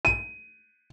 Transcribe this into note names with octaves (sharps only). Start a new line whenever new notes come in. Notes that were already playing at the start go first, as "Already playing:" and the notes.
D#7